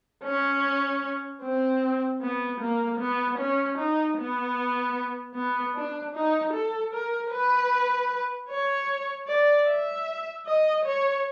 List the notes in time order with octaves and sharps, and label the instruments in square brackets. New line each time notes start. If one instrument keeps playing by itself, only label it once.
[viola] C#4
C4
B3
A#3
B3
C#4
D#4
B3
B3
D4
D#4
A4
A#4
B4
C#5
D5
E5
D#5
C#5